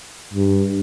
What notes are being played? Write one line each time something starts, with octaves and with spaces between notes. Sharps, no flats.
G2